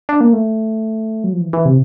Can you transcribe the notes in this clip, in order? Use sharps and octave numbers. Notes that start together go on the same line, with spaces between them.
D4
A#3
A3
F#3
F3
E3
E3
C3